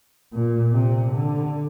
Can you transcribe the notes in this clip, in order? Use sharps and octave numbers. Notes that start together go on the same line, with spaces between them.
A#2
C3
D3